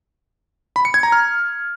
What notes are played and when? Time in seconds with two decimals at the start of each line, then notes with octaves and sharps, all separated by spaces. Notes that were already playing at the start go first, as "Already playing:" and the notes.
0.76 B5
0.85 C#7
0.94 G#6
1.03 A#5
1.12 F6